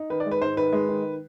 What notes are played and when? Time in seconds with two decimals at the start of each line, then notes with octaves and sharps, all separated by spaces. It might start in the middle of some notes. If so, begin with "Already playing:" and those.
Already playing: D#4
0.10 D#3 B4
0.20 D5
0.26 G#3
0.31 B4
0.42 G#2 C5
0.57 D#3 B4
0.73 G#3
0.89 D#3